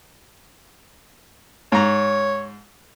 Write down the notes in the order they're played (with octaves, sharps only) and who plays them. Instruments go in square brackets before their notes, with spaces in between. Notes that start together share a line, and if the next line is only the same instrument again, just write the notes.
[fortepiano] G#2 A#5 [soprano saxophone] C#5